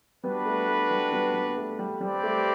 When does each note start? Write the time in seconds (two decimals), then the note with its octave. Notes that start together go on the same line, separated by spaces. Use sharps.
0.24 G3 B3 D4 F#4 B4
0.46 A3
0.68 A3
0.91 G3
1.12 G3 B3
1.34 G3 B3
1.56 A3
1.79 G3
2.01 G3 C4 G4 B4 D5
2.24 A3